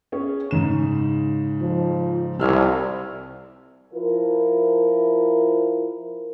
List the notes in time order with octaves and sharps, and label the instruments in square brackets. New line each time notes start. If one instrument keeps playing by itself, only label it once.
[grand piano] C#4 G#4 C#5
G#2 C#3 E7
[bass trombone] F3
[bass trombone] C2 [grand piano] E6 F6 G#6
[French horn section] F3 E4 F4 A#4